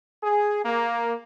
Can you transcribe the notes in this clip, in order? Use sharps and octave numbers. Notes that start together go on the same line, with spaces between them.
G#4
A#3